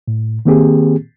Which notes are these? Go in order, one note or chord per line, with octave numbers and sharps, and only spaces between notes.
A2
D#3 A#3 C4 G4 G#4